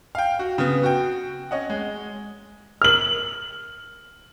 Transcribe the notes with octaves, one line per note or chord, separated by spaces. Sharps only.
F5 G5
F#4
C#3 B3
F#4 G5
C#4 D#5 F#5
G#3
F6 F#7